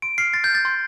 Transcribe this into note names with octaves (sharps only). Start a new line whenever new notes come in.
C6 D7
F6 C7
C6 A6
G6
F6
A6
C6